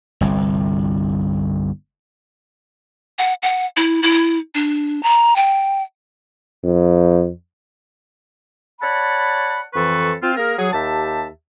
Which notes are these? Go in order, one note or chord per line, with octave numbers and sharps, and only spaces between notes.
G1 C2
F#5
F#5
E4
E4
D4
A#5
G5
F2
C#5 D5 F#5 A5 B5
F2 E3 A4 B4 C#6
C4 F4
A#3 G#4 A#4
F#3 G#4
D#2 G4 E5 A5